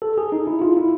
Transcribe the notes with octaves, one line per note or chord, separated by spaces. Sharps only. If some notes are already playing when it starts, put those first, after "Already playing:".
A4
G#4
D#4
E4
F4
E4